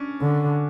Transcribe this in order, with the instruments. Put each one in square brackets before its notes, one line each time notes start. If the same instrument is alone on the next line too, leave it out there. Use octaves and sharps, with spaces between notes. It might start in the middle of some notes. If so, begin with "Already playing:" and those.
Already playing: [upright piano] C#4 D4
[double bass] D3